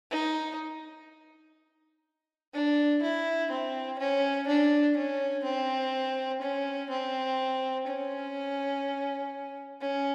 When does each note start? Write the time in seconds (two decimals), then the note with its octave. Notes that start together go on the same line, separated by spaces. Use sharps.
0.11 D#4
2.54 D4
3.03 E4
3.51 C4
3.99 C#4
4.48 D4
4.96 C#4
5.45 C4
6.42 C#4
6.90 C4
7.87 C#4
9.81 C#4